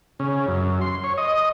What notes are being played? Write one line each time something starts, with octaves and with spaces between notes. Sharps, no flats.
C#3
F#2
C6
C#5
D#5